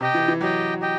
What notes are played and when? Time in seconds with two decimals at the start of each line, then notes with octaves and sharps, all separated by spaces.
0.01 C3 G4 D#5 G5
0.14 E3
0.28 E3
0.40 F#3 G4 D#5 G5
0.81 G4 D#5 G5